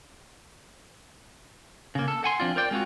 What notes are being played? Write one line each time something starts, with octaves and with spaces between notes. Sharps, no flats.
C#3 A#3
A4
F#5 G#5 C6
F3 C4 D4 F4
A#4 C5 D5 G5
G#3 C4 F4 F#4